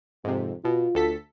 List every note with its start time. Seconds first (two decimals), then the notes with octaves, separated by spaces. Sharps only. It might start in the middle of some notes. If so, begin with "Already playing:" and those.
0.24 F2 G#2 C3
0.65 B2 F4
0.95 D2 A4 B6